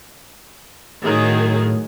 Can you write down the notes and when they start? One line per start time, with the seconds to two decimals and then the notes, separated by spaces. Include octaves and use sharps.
1.03 A2 D#3 F#3 G#4